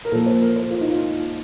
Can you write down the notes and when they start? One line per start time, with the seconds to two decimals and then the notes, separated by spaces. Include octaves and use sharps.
0.05 A#4
0.12 A#2 F3 A4
0.26 C5
0.42 A#4
0.56 C5
0.71 F4
0.81 D#4
0.90 F4